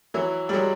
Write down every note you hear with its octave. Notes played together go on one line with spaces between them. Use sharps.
E3 F#3
G3
F#3 G#3